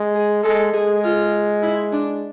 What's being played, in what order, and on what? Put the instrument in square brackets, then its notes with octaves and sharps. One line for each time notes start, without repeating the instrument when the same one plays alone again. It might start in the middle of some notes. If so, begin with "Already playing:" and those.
Already playing: [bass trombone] G#3
[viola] G#4
[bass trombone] G#3 [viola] A4
[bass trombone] G#3 [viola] G#4
[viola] F4
E4
D4